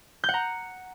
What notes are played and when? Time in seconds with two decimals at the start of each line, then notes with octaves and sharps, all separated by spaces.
0.24 G6
0.29 F#5
0.34 A#5